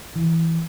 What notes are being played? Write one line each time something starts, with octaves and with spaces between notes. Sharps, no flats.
E3